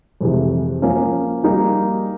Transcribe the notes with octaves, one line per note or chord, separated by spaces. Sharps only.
F2 C3 E3 G#3
F3 A#3 C#4
G3 A#3 D#4 G#4